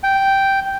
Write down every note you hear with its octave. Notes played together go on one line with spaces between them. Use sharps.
G5